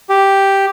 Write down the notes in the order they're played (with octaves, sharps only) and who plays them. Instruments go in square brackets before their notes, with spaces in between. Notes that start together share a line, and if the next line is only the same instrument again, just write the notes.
[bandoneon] G4